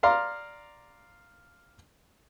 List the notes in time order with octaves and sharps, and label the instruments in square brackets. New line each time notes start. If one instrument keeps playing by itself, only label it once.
[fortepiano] D5 F5 A#5 C6